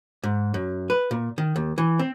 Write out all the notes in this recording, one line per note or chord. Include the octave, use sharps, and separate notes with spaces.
G#2
F#2
B4
A#2
D#3
D#2
E3
C4